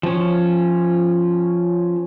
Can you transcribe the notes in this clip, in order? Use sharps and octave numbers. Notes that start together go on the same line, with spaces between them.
F3 C#4